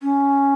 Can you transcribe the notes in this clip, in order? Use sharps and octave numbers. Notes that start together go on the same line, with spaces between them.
C#4